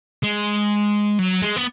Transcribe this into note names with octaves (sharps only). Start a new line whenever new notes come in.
G#3
F#3
G#3
B3